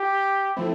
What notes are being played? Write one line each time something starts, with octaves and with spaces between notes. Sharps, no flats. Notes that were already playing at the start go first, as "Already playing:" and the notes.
Already playing: G4
F3 A3 C4 E4